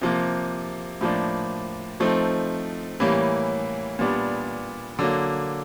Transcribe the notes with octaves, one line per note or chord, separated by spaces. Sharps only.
C3 F3 A#3
A2 F3 A#3 D4
F3 A3 C4 D#4
A2 E3 G3 A#3 C#4
A#2 G3 B3 D4
D3 F#3 A#3